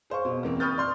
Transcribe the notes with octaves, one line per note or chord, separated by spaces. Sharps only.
G#4 C5 F5 C#6
B2
E2 C#3 A#3 C4
B5 C#6 D#6 F6 G6 A6
D5 C6 F6